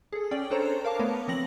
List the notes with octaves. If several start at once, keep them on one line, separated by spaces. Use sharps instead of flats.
G#4 A4
C#4 D5 G5
D4 A4 C5 C#5 A#5
A#4 F5 A5 D6
A3 B3 A#4 B4 C#5
F3 C4 A#6 F#7